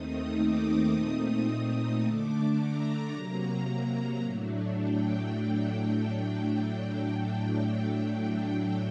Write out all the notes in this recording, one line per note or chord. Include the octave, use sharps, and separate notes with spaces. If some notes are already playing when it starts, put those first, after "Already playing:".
Already playing: D#2 D#3 A3 C4 D#4 D#6
D6
A#2 A3 C4 D#4 D#6
D3 A3 D4 D6
A#5
C3 F#3 A#3
A2 F#3 A3 D4
G5